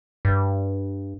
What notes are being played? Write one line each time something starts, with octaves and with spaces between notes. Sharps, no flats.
G2